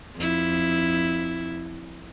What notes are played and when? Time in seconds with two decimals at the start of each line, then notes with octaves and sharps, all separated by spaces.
0.16 F2 E4